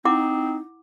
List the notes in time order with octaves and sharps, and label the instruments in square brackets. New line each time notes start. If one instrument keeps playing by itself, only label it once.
[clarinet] C4 [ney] D#4 [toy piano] E4 F#5 D6